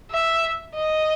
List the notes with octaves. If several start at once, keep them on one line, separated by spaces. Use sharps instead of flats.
E5
D#5